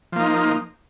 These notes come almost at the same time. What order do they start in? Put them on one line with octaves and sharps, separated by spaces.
F3 A#3 D#4